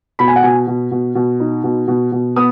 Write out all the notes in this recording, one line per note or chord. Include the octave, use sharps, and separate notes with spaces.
B2 B5
G#5
F#5
B2 G#5
B2
B2
B2
D#4
B2
B2
B2
B3 D#6